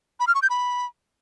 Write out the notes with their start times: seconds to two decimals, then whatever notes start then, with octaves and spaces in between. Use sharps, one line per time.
0.20 B5
0.27 F6
0.35 C#6
0.42 G6
0.50 B5